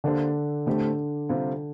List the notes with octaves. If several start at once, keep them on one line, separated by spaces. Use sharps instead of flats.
D3 A#3 D4 G4 C5
A2 D3 A3 C4 G4
C3 G3 C4 F4